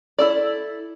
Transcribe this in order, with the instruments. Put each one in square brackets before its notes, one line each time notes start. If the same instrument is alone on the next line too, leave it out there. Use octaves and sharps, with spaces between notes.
[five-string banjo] E4 A4 D5